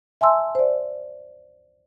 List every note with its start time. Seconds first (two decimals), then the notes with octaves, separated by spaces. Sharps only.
0.21 E5 G#5 A5 C6 E6
0.55 C5 D5